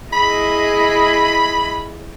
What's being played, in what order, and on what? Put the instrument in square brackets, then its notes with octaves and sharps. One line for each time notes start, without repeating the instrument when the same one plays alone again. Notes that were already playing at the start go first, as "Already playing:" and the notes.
[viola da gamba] E4 G#4 D#5 [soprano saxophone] B5